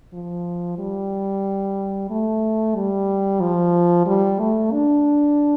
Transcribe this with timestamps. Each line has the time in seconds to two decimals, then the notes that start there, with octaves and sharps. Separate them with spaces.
0.13 F3
0.79 G3
2.10 A3
2.75 G3
3.41 F3
4.06 G3
4.39 A3
4.72 D4